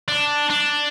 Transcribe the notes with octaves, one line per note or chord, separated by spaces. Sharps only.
D4
D4